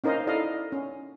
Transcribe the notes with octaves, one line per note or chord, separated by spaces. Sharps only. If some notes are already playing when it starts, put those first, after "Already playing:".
C#4 D#4 A#4 C5 D#5 F5
E4 A4 D5 D#5 F5
C#4